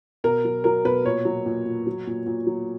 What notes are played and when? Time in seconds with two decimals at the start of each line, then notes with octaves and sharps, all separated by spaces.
0.24 B2 A#4
0.45 F#3
0.64 F#3 A#4
0.85 B2 B4
1.05 A#2 C#5
1.25 F#3
1.46 A#2
1.65 A#2
1.87 F#3
2.07 A#2
2.26 A#2
2.47 F#3